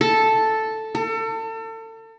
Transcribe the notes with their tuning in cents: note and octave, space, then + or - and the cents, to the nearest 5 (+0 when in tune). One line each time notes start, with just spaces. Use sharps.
A4 +0
A4 +35